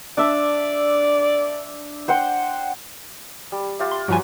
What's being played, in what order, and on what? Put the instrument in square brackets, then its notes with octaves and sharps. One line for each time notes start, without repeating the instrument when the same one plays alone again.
[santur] D4 E5 [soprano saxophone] D5
[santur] C5 F#5 G5
G3
F4 G4 E5
[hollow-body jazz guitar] C6
[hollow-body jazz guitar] G2 F3 G#5 [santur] F#3 B4